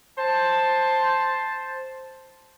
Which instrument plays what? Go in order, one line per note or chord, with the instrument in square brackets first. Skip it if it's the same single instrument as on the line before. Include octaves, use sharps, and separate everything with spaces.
[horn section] C5 A5